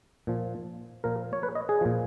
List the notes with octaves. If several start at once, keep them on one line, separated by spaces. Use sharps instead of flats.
A#2 F3
A#2 F3 A#4
C#5
B4
D#5
G#4
A#2 F3